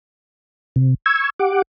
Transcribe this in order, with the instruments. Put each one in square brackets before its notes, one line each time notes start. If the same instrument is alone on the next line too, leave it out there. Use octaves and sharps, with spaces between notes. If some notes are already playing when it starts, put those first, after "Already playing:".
[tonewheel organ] C3
C#6 E6 G#6
G4 F#5 D6